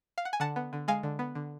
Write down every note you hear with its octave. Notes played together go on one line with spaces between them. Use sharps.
F5
F#5
G#5
D3 F#5 A5
B3
D3
G#3 F5 G#5
D3
B3
D3